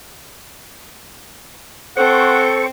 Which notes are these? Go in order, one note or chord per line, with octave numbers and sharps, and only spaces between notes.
C4 A4 C5 F#5 C#6